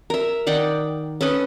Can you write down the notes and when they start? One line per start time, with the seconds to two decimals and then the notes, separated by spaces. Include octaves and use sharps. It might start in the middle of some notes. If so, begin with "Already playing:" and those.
0.10 A#4 E5
0.47 D#3 D5 F#5 G5
1.21 C#4 A4 B4 D#5